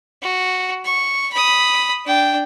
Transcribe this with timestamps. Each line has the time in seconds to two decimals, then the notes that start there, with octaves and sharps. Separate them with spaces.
0.22 F#4
0.85 C#6
1.33 B5 D#6
2.05 D4 G5